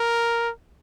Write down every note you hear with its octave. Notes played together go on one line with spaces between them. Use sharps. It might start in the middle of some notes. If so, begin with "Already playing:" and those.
Already playing: A#4